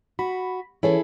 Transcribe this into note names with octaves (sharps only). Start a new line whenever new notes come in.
F#4 B5
E3 C#4 E4 G#4 A4